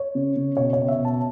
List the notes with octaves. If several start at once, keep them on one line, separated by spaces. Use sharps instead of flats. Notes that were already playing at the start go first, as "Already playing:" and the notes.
Already playing: C#5
C#3
C#3
B2 C#5
C#5
B3
E5
B2
A5